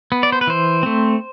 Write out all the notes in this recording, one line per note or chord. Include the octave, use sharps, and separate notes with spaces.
B3
D5
C5
B4
E3 C5
A3 C4